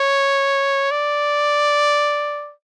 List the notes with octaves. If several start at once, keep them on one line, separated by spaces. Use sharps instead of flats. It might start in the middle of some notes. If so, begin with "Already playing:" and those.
Already playing: C#5
D5